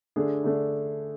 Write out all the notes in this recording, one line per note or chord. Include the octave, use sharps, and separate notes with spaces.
D3 A3 D4 G#4
D3 A3 D4